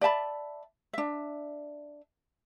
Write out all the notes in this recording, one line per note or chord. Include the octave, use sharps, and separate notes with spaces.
D5 E5 A5 B5
D4 E5